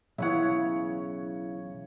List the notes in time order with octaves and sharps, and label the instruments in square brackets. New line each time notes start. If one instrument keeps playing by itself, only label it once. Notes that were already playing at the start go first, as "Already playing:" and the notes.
[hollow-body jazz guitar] B1 E3 F#5 [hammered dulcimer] C#3 C#5 [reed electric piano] E4 E5